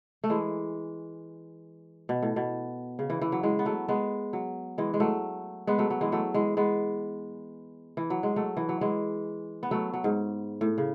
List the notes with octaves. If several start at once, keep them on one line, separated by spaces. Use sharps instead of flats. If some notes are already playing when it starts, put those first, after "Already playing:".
A3
E3 G#3
B2
A2
B2
C#3
E3
E3
F#3
E3 G#3
B3
F#3 A3
G#3 B3
F#3
E3 G#3
G#3
F#3 A3
G#3 B3
F#3 A3
F#3
E3 G#3
F#3 A3
E3 G#3
G#3 B3
E3
F#3
G#3
F#3 A3
E3
F#3
E3 G#3
B3
F#3 A3
F#3
G#2
A2
C#3